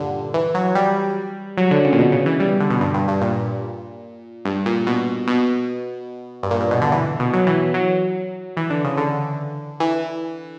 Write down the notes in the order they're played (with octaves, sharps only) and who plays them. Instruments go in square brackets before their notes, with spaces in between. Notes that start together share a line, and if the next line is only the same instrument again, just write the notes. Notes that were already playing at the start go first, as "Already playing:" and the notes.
Already playing: [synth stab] G2 A#2 D3
E3
F#3
G3
F#3
D3
C#3
A#2
B2
C#3
E3
G3
D3
B2
G2
G2
G2
A#2
G2
A#2
B2
B2
G2
A#2
G2
B2
D3
E3
B2
F#3
E3
F#3
E3
D3
C#3
D3
E3